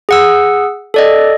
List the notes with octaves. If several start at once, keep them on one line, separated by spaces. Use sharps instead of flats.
G#4 F#5 E6
A4 D5 D#5